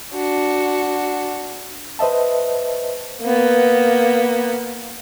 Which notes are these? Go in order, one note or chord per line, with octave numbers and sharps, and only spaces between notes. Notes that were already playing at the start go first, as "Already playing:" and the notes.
D4 F#4
B4 C5 D#5 E5 A5
A#3 B3